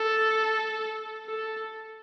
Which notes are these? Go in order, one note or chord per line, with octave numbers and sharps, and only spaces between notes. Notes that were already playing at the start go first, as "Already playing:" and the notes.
Already playing: A4
A4